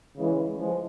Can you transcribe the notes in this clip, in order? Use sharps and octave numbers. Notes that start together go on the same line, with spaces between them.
C#3 E3 G#3
F3 G#3